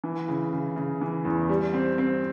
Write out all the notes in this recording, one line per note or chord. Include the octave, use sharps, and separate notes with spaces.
E3
C#3
C#3
C#3
E3
E2
G3
C4
C4